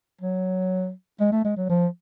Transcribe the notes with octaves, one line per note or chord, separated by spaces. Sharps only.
F#3
G#3
A3
G#3
F#3
F3